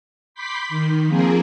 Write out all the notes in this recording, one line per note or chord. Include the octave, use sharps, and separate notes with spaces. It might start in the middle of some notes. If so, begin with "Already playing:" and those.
B5 C6 D6 G6 B6
D#3
F3 A#3 C4 G#4 A#4